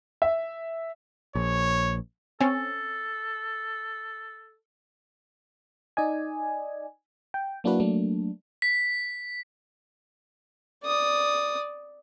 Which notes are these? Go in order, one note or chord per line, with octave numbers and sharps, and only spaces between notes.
E5
A#1 C#5
C4 C#4 A4
D#4 D5 D#5 G#5
G5
F#3 A#3 D4 E4 F#4 B4
F#3 A3 A#3 D4
B6
D5 D#6